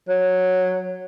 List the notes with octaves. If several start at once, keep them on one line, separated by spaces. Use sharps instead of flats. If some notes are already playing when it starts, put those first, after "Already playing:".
F#3